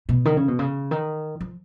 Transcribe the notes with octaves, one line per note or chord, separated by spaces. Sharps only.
B2
D#3
C#3
B2
C#3
D#3
F3